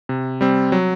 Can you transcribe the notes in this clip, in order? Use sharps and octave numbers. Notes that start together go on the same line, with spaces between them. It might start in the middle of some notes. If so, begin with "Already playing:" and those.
C3
G3 C4
F#3